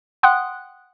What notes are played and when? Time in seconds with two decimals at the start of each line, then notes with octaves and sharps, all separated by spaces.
0.23 F#5 G5 C6 D#6 F#6